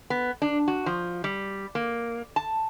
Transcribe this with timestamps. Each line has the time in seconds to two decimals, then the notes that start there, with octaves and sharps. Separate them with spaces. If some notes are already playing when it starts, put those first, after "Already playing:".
0.10 B3
0.42 D4
0.68 F#4
0.86 F3
1.24 G3
1.75 A#3
2.36 A5